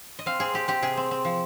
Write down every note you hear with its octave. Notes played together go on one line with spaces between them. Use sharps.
D#5
C4 F5
C4 G#4
C4 G4
C4 G4
C3 G#4
C4
C4
F3